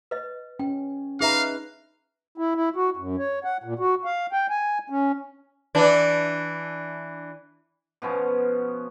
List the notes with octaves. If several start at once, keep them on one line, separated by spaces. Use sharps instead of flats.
B4 D#5
C#4 G5
D#4 G#4 B4 E5 F5 A#5
E4
E4
F#4
F#2
C#5
F#5
A#2
F#4
F5
G5
G#5
C#4
E3 D4
B2 F3 B3 C#4